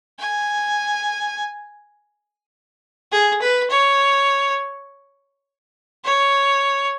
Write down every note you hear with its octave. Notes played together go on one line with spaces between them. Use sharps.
G#5
G#4
B4
C#5
C#5